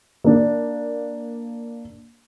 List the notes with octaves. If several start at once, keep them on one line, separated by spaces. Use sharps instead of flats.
A#3 D4